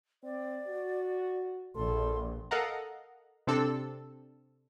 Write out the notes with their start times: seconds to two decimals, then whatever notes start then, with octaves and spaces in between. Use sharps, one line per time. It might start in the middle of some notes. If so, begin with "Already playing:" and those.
0.24 C4 D5
0.68 F#4
1.76 A#1 A4 C6
2.51 A4 A#4 D#5 F5 F#5 A#5
3.47 C3 C4 D4 A4 D5 E6